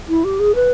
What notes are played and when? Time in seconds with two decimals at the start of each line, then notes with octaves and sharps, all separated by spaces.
0.09 E4
0.24 G4
0.39 G#4
0.55 B4